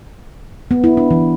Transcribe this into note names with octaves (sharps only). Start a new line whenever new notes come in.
B3
E4
D4
E3